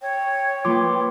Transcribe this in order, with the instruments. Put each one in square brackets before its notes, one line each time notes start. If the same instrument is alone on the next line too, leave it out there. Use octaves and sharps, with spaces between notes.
[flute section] C#5 [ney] G5
[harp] F3 A#3 B4 [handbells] C6 D6